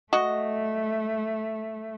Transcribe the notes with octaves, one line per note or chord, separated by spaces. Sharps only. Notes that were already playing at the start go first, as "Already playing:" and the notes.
A3 F#4 D#5